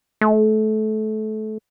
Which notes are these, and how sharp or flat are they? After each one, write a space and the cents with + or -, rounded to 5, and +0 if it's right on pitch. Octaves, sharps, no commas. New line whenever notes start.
A3 -25